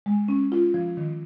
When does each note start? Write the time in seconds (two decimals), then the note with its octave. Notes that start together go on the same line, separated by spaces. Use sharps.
0.06 G#3
0.28 C#4
0.52 F4
0.74 F3
0.97 D#3